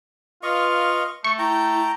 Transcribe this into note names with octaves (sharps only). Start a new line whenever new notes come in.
F4 B4 D#5 F5 C#6
A3 C#6
E4 G5 A#5